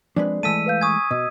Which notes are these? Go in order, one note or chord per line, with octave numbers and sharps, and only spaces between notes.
F3 G#3 C4 D4 G#4 B4 D5
E3 G#3 A3 A5 E6 B6 D#7
B4 F5 G6
G#5 C#6 D#6 G#6
B2 D#5 E6